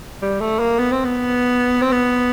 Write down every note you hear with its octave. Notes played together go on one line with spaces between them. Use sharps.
G3
A3
A#3
B3
C4
B3
C4
B3